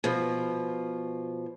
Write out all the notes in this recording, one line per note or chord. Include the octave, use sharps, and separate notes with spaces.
B2 F3